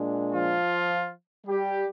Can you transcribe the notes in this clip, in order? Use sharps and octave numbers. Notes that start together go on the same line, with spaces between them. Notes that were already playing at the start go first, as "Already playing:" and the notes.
Already playing: A#2 G#3 D4
F3 F4
G3 G4